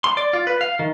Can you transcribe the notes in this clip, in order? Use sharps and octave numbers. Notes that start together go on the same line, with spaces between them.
C6
D5
F4
B4
F5
D#3